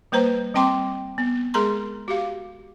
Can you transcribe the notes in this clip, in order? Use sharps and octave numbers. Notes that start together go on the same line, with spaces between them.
G3 A#3 B4 C5 A#5
G3 C4 G5 C6 D6
B3
G#3 G#4 A#4 A#5 C6
F#4 G4 F5